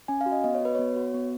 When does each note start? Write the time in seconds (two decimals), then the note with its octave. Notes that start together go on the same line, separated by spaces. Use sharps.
0.08 C#4 G#5
0.21 F5
0.26 F#4
0.32 D#5
0.44 B3 D#5
0.54 C#5
0.61 F#4 B4
0.75 B3 C#5
0.96 F#4
1.14 B3